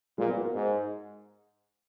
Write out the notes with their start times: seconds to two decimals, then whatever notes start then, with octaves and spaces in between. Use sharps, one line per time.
0.18 A#2 G#3
0.28 B3
0.36 F#4
0.45 A#4
0.54 G#2